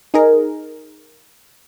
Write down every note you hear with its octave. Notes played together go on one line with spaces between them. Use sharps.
D#4 G#4 A#4